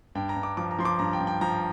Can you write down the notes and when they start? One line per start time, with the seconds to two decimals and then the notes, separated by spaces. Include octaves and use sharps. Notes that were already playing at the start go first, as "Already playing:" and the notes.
0.15 G2 G5
0.29 A#5
0.36 G2
0.43 D6
0.57 F3 D6
0.71 A#5
0.79 F3 C6
0.85 D6
0.99 G2 A#5
1.13 G5
1.20 G2
1.27 G5
1.41 F3 A#5